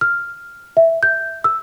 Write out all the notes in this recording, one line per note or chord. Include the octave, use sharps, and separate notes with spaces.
F6
E5
G6
E6